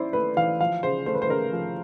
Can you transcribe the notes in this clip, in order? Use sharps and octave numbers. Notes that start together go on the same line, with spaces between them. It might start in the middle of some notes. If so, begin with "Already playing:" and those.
Already playing: C#4 E4 C5 D5
A3 B4
E3 F5
F3 F5
C#3 C5
A3 C5
B4
C5
C#3 A#4
F3